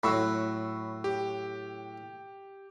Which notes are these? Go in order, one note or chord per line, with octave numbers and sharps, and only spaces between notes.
A2 F#3 B5 C#6 E6
G4